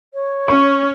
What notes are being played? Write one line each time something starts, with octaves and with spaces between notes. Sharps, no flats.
C#5
C#4 C#6